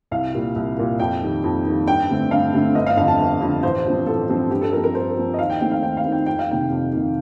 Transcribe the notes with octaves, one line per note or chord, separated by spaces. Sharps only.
C2 F5
A#2 G3 A#3
C2
A#2 G3 A#3
F2 G5
D#3 G3
F2
D#3 G3
G2 G5
D3 A3 C4
G2 F5
D3 A3 C4
G1 D#5
F5
F2 D3 F5
A5
G1
F2 D3
A1 C5
G2 F3 C4
A1 A4
G2 F3 C4
G2 G4
A4
F3 C4 A#4
A#4
G2 C5
F3 C4
D#5
D#2 F5
G5
D#3 A3 C4 G5
F5
D#2 G5
F5
D#3 A3 C4
G5
F2 G5
F5
C3 D#3 G5
F2
C3 D#3